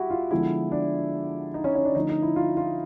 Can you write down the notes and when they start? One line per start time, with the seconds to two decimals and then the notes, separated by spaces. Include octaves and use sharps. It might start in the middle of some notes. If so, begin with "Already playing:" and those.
Already playing: G3 E4 F#4 G4
0.10 F4
0.31 D3 F3 G#3 B3 E4
0.72 D4
1.54 D#4
1.64 C#4
1.75 C#4
1.85 D4
1.95 D3 F3 A3 D#4
2.09 D#4
2.22 E4
2.36 F4
2.57 F4